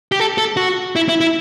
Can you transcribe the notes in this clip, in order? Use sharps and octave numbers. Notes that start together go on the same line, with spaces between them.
G4
A4
A4
F#4
E4
E4
E4